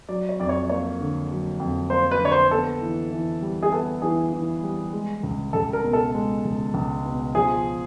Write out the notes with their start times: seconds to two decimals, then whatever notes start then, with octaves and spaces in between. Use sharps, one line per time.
0.09 F#3 D5
0.29 C#5
0.40 F2 D5
0.49 C#5
0.69 A#3 C#5
1.00 D3
1.31 F#3
1.60 F2
1.90 A#3 C5
2.11 B4
2.21 D3 C#5
2.32 C5
2.51 B3 A4
2.81 E3
3.11 E3
3.42 G3
3.63 G#4
3.72 B3 A4
4.02 E3 G#4
4.33 E3
4.63 G3
4.93 G#3
5.23 C#2
5.53 C#2 A4
5.73 A#4
5.84 B2
5.93 A4
6.15 G#3
6.45 C#2
6.74 C#2
7.05 B2
7.35 F3 G#4